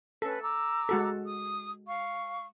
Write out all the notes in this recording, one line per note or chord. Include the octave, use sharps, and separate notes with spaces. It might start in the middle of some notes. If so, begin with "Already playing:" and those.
C#4 A4 B4 A5
A#5 D6 E6
G#3 F#4 A4
D#6
F5 C#6